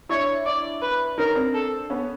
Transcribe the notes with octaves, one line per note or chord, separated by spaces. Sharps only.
D4 E4 C#5
D5
B4
C#4 D#4 A#4
C4 D4
A4
B3 C#4